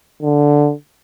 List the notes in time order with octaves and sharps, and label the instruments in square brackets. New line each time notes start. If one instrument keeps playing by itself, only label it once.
[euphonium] D3